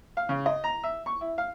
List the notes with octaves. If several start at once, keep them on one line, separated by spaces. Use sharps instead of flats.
F5
C#3
D#5
A#5
E5
C#6
E4
F5